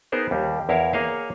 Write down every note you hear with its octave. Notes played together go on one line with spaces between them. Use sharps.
B3 D#4 G#4 A#4 C5
D#2 G3
E2 E4 A#4 C#5 F5
A#3 G#4 C#5 D#5 F5